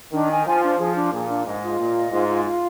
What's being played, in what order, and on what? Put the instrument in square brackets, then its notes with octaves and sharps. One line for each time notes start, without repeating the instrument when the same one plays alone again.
[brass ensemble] D#3 [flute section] D4
[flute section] G#5
[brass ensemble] F3 [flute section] G#5
[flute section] D4
[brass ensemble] F3 [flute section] G#4
[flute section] D4
[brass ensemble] A#2 [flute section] G#4
[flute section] D4
[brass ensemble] G#2 [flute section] D#5
[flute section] F4
[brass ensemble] A#2 [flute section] D#5
[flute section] D#5
[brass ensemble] G#2 [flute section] F4
[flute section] F4
F4